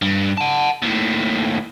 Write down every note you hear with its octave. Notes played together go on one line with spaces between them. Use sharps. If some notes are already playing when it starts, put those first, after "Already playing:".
G2
F#5 A5
D#2 A2